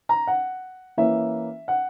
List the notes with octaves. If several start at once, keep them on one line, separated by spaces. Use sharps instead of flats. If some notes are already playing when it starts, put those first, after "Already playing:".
A#5
F#5
E3 A#3 C#4 E5
F#5